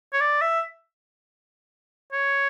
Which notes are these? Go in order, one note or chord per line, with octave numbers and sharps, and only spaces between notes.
C#5
D5
E5
C#5